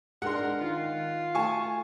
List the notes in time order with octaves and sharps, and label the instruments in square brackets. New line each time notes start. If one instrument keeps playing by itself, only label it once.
[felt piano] G#3 D4 [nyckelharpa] A#4 [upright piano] F#5 C6
[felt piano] D#3 [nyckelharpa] F4
[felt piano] A3 [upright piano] G#5 A5 C#6